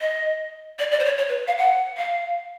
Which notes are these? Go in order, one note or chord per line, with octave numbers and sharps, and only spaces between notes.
D#5
D5
D5
C5
C#5
C#5
B4
F5
F#5
F5